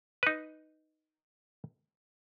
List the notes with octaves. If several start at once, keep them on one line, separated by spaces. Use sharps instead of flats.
D#4 B4